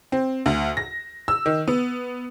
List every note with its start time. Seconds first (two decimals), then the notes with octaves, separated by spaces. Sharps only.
0.12 C4
0.46 D2
0.77 A#6
1.28 E6
1.46 D#3
1.67 B3